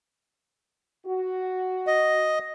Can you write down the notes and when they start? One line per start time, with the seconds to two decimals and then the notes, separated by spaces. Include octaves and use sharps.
1.05 F#4
1.87 D#5